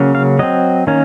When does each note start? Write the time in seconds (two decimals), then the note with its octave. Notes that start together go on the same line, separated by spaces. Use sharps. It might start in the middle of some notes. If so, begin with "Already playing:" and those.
Already playing: C#3 F#3 A#3 C#4
0.15 F5
0.39 F#3 C4 D#5
0.87 D#3 A#3 C#4